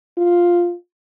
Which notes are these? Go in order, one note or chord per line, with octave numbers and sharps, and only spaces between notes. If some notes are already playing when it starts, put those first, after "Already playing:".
F4